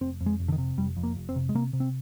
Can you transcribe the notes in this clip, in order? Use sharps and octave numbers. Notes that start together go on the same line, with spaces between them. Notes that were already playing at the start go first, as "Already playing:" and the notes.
F1 C4
F2
G#3
F1
D3
D#3
C3
F1 G3
F2
A#3
F1
C4
C3
G#3
C3 A#3
C3
C4